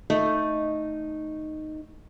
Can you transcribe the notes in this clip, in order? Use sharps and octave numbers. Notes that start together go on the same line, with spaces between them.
A3 D#4